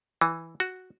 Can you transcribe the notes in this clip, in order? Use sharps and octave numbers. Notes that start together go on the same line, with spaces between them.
E3
F#4